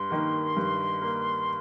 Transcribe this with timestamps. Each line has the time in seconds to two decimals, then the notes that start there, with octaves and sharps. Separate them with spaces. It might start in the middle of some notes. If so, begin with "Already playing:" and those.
Already playing: G2 C6
0.10 D#3 A#3
0.57 G2
1.02 A#3